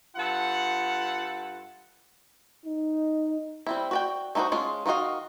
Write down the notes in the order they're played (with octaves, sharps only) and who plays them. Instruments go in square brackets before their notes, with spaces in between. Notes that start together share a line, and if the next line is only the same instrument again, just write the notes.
[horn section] G2 F4 A4 F#5
[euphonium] D#4
[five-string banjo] G3 C4 E4
F#4 D5 G5
A3 D#4 E4 F#4 C5
G#3 C#4 F4
D#3 F4 F#4 D#5 F5